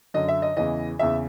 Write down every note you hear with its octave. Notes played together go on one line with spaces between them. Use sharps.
F#2 D3 D#5
E5
D#5
E2 C#3 E3 D#5
E2 C#3 E3 E5